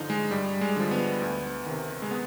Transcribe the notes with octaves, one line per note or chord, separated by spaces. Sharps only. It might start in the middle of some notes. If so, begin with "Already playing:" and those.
Already playing: G2 D3 F3 D#4 F4
G#3
G2 G3
G#3
D3 F3
B3
D2
C3 D#3
G#3
B3